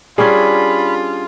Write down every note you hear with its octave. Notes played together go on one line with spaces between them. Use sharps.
G3 C#4 D4 F4 G#4 B5